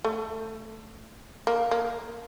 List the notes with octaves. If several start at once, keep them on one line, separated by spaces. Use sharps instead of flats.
A3
A#3
A#3